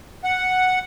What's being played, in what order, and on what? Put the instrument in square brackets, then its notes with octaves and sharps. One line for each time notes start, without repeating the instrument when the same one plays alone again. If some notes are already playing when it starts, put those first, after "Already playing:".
[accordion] F#5